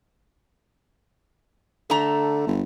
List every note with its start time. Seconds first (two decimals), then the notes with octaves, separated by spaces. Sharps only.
1.90 D3 A3 A#5
2.47 G1